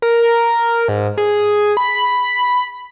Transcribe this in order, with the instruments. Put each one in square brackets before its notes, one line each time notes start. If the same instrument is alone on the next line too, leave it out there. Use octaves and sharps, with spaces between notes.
[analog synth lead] A#4
G#2
G#4
B5